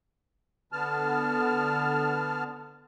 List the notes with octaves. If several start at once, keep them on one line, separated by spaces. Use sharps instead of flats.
D3 B3 A5 F6